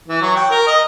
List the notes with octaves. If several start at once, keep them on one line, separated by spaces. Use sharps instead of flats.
E3
F#3
G5
A#4
D#5